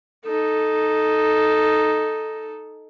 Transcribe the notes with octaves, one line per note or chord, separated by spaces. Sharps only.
D#4 A4